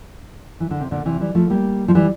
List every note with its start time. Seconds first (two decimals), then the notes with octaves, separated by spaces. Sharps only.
0.60 E3
0.71 D3
0.81 C3
0.91 A#2 D3
1.05 C3 E3
1.21 E3 G3
1.35 F3 A3
1.50 G3 A#3
1.88 F3
1.95 E3 G3